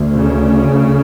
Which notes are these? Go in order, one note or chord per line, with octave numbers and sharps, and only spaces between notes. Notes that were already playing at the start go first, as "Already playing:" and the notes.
Already playing: D2
C#3